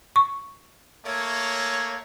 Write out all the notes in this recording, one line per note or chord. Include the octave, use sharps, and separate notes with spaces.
C#6
A3 A#3 C#5